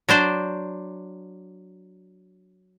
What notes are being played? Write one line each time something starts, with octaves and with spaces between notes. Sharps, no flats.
F#3 D4 C5 D5